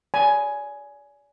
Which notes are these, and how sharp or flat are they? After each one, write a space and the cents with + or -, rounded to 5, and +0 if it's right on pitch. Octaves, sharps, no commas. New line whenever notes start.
D5 -35 G#5 +10 B5 +0